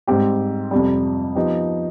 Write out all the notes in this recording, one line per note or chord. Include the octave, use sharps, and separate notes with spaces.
G#2 G3 C4 G4
F2 C3 G3
F3 B3 D#4 G4